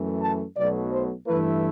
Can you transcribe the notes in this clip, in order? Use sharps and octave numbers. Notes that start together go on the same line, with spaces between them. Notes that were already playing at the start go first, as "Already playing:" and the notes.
Already playing: F#2 E3 A3
A5
B1 B2 F#3 A3 D5
C5
G2 E3 A3 E4 B4